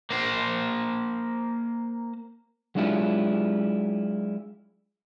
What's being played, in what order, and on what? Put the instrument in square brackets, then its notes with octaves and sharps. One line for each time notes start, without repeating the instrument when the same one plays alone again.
[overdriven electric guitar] A#3 C5
[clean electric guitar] F#3 G#3 D4 E4 F4 G4